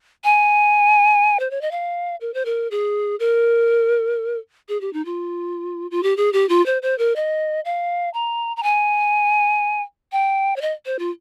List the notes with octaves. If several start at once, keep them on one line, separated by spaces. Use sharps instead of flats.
G#5
C5
C#5
D#5
F5
A#4
C5
A#4
G#4
A#4
G#4
G4
D#4
F4
F4
G4
G#4
G4
F4
C5
C5
A#4
D#5
F5
A#5
A#5
G#5
G5
C#5
D#5
C5
F4